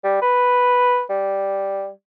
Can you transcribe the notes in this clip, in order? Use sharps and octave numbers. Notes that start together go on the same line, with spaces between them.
G3
B4
G3